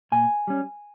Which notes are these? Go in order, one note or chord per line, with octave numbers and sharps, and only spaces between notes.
A#2 G#5
G3 C#4